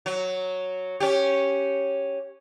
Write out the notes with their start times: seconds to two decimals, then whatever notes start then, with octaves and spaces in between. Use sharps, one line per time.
0.06 F#3
1.00 C#4 G4